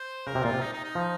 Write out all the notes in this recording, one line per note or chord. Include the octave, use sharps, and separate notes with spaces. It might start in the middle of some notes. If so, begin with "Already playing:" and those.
Already playing: C5
C#3 A#4
C3
A#2 F4
C3
D#4
D#4
D#4
F3